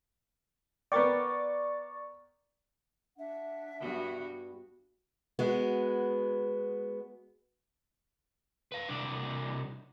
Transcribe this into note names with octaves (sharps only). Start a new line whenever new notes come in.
B3 A#4 D5 G5 C#6 A6
D4 E5 F#5
G2 B3 F#4
G#3 B3 F#4
B4 F5
C2 D4